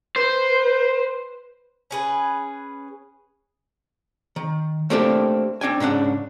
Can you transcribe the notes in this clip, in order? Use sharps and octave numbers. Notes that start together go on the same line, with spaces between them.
B4 C5
C#4 G#4 B4
D#3
A3 A#3 C4 D4 G4 A4
C4 D4 G5 G#5
G#2 C#3 D4 F#5